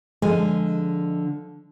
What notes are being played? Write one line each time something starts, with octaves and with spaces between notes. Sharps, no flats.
D3 F3 G#3 G#5